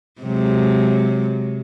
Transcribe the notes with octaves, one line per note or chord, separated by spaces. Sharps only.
C3 F#3 G#3